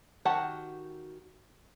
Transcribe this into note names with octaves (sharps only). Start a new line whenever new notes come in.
D#3 F#4 G4 F#5 A5